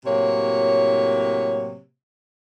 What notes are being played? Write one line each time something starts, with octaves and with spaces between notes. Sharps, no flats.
A2 C3 F#3 A#3 C#5